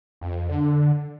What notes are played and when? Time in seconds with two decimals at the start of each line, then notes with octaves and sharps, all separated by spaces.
0.21 F2
0.49 D3